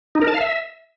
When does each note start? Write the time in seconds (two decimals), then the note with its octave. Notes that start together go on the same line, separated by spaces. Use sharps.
0.15 D#4
0.22 A#4
0.28 A5
0.34 F5
0.41 E5